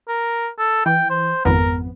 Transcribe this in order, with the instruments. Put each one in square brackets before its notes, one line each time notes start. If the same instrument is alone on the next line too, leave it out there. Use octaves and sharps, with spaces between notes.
[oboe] A#4
A4
[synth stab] E3 [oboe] G5
[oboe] C5
[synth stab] G#1 F2 B3 [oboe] A#4